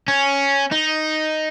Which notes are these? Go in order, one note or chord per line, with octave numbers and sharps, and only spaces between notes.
C#4
D#4